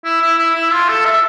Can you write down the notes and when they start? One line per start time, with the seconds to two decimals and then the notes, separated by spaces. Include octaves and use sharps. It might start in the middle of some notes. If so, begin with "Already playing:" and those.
0.05 E4
0.21 E4
0.38 E4
0.55 E4
0.72 F4
0.89 A4
1.05 E5